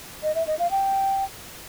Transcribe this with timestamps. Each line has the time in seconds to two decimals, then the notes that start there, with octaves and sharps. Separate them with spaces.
0.23 D#5
0.35 E5
0.47 D#5
0.59 F5
0.71 G5